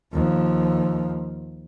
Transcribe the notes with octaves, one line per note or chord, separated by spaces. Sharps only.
D#2 F3